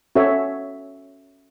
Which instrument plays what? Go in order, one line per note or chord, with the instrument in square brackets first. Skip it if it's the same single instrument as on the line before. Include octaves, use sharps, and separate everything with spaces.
[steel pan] C#4 F#4 A4 C#5 E5